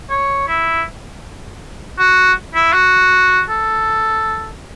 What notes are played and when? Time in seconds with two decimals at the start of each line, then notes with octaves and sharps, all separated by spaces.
0.10 C#5
0.48 E4
1.98 F#4
2.55 E4
2.73 F#4
3.49 A4